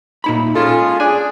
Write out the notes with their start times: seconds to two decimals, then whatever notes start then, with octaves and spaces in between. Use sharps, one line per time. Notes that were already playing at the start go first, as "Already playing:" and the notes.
0.24 A#2 D#4 B5
0.55 G#3 C#4 F4 G#4 A4
1.00 D4 G#4 G#5